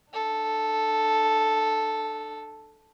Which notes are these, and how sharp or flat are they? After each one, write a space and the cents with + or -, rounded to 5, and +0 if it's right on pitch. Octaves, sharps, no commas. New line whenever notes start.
D4 +35 A4 +0